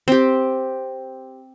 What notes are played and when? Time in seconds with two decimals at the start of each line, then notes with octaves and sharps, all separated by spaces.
0.08 C4 G4